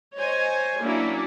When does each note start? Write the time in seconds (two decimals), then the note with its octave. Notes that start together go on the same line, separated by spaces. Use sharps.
0.18 C5 C#5 D#5 G#5
0.80 F#3 A#3 C#4 D4 E4